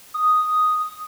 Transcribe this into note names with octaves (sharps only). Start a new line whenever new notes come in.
D#6